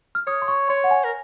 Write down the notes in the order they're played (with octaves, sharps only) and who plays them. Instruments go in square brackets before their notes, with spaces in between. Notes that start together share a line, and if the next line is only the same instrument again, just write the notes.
[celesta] F6
[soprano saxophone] C#5 [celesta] D#6
[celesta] C6
C#6
[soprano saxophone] C#5 [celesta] C6
[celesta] F#5
G#5
[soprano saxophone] A#4